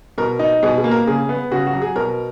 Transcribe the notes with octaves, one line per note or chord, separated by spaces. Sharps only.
B2 A#4
D#4
B2 G#4
G#4
A#3
A#4
C#3 G#4
B3
C#3 F#4
F#4
F#3
G#4
B2 A#4